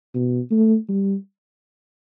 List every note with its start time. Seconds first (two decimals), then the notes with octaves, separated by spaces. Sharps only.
0.15 B2
0.51 A3
0.89 G3